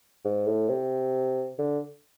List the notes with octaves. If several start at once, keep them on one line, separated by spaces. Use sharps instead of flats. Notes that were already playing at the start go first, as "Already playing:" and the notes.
G#2
A2
C3
D3